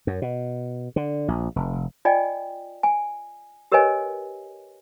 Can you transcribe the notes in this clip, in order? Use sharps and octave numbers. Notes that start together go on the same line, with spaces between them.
F#2
B2
D3
A#1
F1
F4 D5 D#5 G5 G#5
G#5
G4 A#4 B4 C#5 D#5 G#5